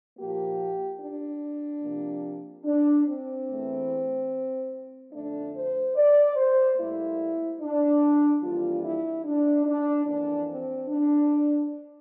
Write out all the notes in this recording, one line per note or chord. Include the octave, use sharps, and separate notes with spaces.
A#2 F3 A#3 G4
D4
C3 F3 A#3
D4
C4
E2 E3 A3
F2 D3 A3 D4
C5
D5
C5
A2 G3 A#3 E4
D4
F2 E3 G3 A#3 F4
E4
D4
D4
F2 E3 A#3 D4
C4
D4